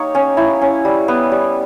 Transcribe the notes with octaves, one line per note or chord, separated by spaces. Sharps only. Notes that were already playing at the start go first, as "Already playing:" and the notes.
Already playing: A#3 D#4 G4 C#5
C#4
E4
C#4
G3
B3
G3